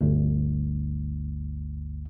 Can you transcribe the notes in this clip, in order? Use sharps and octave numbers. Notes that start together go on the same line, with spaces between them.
G1 D2